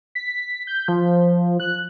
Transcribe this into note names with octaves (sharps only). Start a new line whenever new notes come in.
B6
G6
F3
F#6